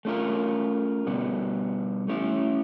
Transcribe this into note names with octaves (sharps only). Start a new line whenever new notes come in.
A3 C#4 F4 A#4
B2 G3 B3
A3 C#4 E4